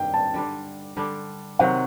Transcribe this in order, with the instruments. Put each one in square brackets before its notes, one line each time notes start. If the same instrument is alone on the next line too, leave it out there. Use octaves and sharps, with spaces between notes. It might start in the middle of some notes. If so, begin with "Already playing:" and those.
Already playing: [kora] G2 D#3 G3 [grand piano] G5
[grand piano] A5
[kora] D3 G3 D4
D3 G3 D4
[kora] C3 D#3 F#3 [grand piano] F#5